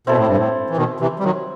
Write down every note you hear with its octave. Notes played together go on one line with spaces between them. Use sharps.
B2 C4 E4 A4
A2
G2
A2
E3
B2 D#3
C3 E3
G3
D#3 F#3